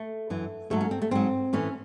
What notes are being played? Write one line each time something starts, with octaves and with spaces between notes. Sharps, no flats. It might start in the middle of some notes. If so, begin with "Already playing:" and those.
Already playing: A3
F#2 E3
G#2 F#3 A3
C#4
C4
A3
G#2 F#3 C4
A2 E3 C#4